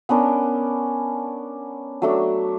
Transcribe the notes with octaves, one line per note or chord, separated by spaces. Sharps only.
B3 C#4 D4 A#4
F#3 A3 D4